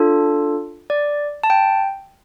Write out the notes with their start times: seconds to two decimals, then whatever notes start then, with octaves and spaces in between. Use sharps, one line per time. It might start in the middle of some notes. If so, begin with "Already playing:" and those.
Already playing: D4 F4 A4
0.90 D5
1.44 A5
1.50 G5